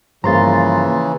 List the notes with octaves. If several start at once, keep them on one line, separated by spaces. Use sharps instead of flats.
G1 C#3 E3 F3 A#3 A#5 C6 A6